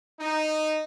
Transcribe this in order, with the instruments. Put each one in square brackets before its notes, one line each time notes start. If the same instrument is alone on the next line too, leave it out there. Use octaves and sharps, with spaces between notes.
[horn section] D#4